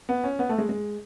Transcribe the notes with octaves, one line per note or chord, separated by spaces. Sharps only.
B3
C#4
B3
A3
G#3
G#3